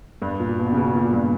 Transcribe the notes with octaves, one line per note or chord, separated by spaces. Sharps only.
G2
A#2
B2
C#3
B2
A#2
G2